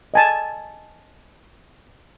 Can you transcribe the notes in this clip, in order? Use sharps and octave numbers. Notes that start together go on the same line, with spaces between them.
D#5 G#5 A5